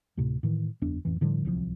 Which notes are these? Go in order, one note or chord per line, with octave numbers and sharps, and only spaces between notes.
D2 A2 C3
A2 D#3 E3
F#1 E2 D4
A1 F2 E3
A2 D3 F3 G3
D1 C2 C3 F3